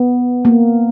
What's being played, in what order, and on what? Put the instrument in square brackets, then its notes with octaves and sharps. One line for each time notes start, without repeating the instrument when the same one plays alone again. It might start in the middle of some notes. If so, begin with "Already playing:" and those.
Already playing: [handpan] B3
A#3